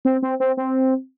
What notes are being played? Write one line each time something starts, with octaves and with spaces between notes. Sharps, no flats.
C4
C4
C4
C4